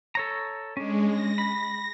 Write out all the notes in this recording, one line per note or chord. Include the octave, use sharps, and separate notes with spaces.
A4 C#5 A#5
G#3 C#4 D4
A#6
B5